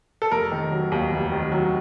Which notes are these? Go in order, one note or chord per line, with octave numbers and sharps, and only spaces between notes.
A4
F1 A#4
D#3
F#3
D#2
F1
D#3
F#3